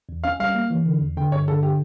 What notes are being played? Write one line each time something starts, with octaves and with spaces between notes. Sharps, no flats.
E2
C#4 F5
G3 F5
A#3
E3
D3
E2
D3 G5
G2 C#5
D3 A4
G4